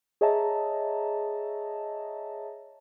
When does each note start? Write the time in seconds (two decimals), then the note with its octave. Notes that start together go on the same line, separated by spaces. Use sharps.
0.21 G#4 C#5 D#5 E5 A5 A#5